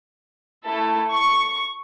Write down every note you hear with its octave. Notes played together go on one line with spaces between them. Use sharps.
A3 E4 A4
C#6